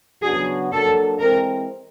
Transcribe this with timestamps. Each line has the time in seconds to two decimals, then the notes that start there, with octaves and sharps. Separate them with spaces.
0.23 C#3 F#3 B3 D4 F#4 G#4
0.71 F#3 A#3 D4 A4
1.20 E3 G#3 C4 A#4